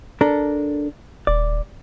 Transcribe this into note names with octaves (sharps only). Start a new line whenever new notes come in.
D4 A4 A#4
D#1 D5